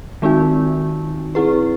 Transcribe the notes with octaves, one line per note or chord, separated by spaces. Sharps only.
D#3 G#3 C4 D#4 F#4
C4 E4 G#4 B4